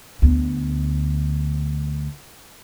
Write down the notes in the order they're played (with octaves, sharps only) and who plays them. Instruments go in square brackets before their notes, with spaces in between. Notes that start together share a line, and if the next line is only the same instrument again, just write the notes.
[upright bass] D2 B3